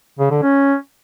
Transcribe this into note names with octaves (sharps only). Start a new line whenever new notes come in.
C#3
D3
C#4